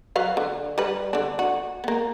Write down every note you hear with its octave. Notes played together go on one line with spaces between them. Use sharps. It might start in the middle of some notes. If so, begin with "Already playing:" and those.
F#3 B4 F5
D3
G3 B4
D3 D4
F#4
A#3 B3